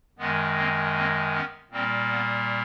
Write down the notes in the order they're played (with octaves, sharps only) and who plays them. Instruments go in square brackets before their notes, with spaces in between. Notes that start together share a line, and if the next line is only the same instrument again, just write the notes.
[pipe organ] F#2 D#3 G#3 B3
A#3 C4
A#3 C4
B3 C#4
A#2 G3 A#3 C4
B3